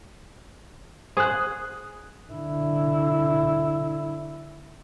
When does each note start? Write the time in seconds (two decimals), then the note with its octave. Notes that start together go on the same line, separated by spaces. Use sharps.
1.17 G#4 C5 D#6 F#6
2.32 D3 E4